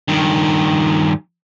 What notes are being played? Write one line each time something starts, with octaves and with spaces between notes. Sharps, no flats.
G2 D#3